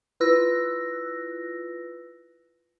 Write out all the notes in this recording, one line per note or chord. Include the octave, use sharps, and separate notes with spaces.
E4 F4 B4 E6 F#6 A#6